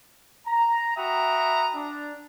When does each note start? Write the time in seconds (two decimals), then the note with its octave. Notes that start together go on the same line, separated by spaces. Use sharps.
0.46 A#5
0.97 F#4 E5 G5 A#5 B5 D#6
1.75 D4